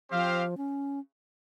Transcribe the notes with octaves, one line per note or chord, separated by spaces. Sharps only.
F3 C4 G4 C5 F5
C#4